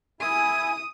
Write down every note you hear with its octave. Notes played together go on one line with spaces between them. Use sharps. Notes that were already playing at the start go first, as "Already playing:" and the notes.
E4 G#5 D#6